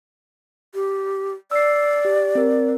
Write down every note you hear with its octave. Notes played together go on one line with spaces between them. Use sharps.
G4
D5 E6 C7
G4
C4 A#4